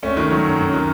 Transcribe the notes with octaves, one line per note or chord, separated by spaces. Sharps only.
A3 C#4
D#3
F#3
F#2
F#2
D#3